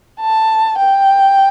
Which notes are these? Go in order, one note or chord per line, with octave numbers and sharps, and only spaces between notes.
A5
G5